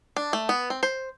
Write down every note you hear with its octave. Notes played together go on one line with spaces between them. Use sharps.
D4
A3
B3
C4
C5